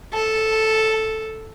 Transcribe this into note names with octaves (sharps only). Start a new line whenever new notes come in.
A4